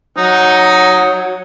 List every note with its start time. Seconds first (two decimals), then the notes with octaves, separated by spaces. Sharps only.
0.17 F#3 D#4